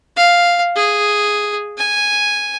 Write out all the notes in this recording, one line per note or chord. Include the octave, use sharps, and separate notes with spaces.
F5
G#4
G#5